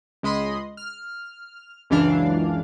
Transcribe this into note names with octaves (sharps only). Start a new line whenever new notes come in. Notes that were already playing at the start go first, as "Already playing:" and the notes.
C#2 G#3 D#5 B5 C6 D#6
F6
C#2 F#2 E3 D4 F5